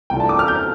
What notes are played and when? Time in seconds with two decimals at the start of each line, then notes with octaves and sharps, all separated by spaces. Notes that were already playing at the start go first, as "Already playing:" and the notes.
0.10 C2 C3 A3 D4 F4 G5
0.20 A5
0.29 D6
0.39 F6
0.48 G6